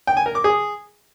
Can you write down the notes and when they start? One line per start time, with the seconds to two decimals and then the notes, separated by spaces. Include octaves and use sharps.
0.07 G5
0.17 G#5
0.26 A#4
0.35 D6
0.44 G#4